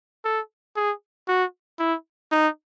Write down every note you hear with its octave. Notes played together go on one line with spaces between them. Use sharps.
A4
G#4
F#4
E4
D#4